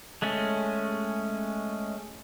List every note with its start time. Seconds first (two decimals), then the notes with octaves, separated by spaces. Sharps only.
0.22 G#3 A3 C#4